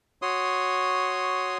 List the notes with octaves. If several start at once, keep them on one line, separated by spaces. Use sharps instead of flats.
F#4 C#5 C6 D#6